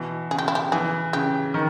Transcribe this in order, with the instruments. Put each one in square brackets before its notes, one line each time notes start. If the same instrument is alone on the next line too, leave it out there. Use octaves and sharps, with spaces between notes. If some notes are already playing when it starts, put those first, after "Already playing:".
Already playing: [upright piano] B2 E3
[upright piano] C#3 [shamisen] G#4
[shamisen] G4
E4
G4
[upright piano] E3 [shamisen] G#4
[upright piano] C#3 [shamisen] G4
[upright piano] D#3